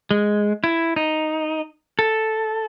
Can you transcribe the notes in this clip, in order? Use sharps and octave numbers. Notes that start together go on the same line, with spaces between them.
G#3
E4
D#4
A4